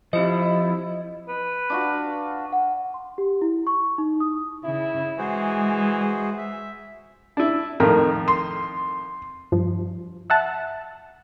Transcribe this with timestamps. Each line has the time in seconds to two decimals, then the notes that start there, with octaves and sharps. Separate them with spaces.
0.13 F3 C4 E4 G4 C5 D#5
1.28 B4
1.70 D4 F4 F#4
2.53 F#5
2.94 C6
3.18 G4
3.42 E4
3.67 C#6
3.98 D#4
4.20 D#6
4.64 C#3 E4
5.19 E3 G#3 F#4 G#4 C5
6.38 E5
7.37 D4 E4
7.80 F2 A2 D#3 A#4
8.28 C6
9.52 G2 F3
10.30 E5 F#5 A5